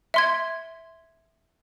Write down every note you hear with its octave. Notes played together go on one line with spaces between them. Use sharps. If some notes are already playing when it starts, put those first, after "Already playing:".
E5 C6 G#6